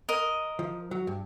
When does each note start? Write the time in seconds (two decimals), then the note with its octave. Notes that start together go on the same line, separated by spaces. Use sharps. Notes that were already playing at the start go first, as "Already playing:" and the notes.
0.09 A#4 D#5
0.59 F3
0.91 F#3
1.07 G2